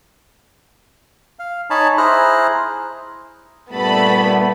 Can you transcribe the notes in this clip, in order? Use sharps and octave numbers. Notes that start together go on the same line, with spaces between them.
F5
D#4 C#5 G#5 A5 B5
E4 G#4 C5 A#5 F6 F#6
G2 A#2 G3 A3 B3 B4 A5 B5